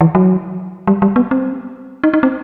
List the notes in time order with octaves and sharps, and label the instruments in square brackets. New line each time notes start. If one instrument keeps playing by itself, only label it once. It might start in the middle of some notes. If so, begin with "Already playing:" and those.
[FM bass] E3
F#3
G3
G3
B3
C4
D#4
D#4
C4